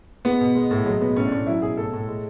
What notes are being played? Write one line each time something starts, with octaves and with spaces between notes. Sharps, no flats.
G#3 B3
B2
G#3
A2
F#3 G#3
B2 B3
A2 C#4
D4
A2 C#4
F#3 E4
B2 G#4
A2 A4
A2
G#3